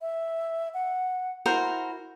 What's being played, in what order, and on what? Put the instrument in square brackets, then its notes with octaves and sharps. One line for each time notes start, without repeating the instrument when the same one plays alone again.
[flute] E5
F#5
[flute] E4 [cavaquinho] F#4 A#4 C5